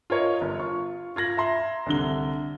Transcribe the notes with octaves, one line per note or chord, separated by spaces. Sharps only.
F4 A#4 C#5 D#5
G1
F4 C#6
F4 G#6 A#6 F#7
E5 A#5 C6
C2 D3 G7